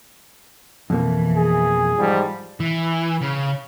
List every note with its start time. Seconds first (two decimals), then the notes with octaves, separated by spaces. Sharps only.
0.90 F2 B2 E3 A#3
1.37 G#4
1.95 G#2 F3 G3
2.60 E3
3.21 C#3